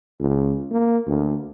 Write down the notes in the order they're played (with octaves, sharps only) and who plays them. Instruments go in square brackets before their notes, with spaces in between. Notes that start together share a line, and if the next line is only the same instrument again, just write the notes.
[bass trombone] C#2
A#3
D2